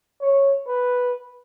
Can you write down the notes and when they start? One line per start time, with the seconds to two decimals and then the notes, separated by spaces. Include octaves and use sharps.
0.21 C#5
0.67 B4